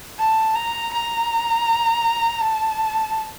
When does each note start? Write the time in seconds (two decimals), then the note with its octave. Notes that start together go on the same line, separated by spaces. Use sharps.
0.18 A5
0.55 A#5
0.93 A#5
2.41 A5